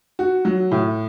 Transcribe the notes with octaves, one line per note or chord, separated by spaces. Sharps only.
F#4
F#3
A2